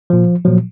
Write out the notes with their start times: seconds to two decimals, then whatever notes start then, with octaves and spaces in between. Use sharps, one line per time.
0.10 A#2 F3
0.45 A#2 F3 F#3